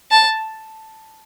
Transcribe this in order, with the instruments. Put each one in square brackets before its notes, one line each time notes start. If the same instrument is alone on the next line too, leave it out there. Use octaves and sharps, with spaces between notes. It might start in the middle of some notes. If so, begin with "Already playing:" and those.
[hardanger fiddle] A5